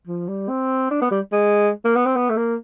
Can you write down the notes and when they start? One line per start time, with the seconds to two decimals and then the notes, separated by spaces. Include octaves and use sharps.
0.07 F3
0.28 G3
0.49 C4
0.91 D4
1.02 B3
1.11 G3
1.32 G#3
1.85 A#3
1.96 B3
2.06 C4
2.16 B3
2.30 A3
2.37 A#3